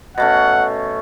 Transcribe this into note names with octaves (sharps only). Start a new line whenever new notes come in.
B2 A3 C#4 F#5